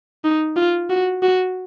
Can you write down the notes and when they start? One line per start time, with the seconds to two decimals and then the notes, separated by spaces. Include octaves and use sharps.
0.24 D#4
0.56 F4
0.90 F#4
1.23 F#4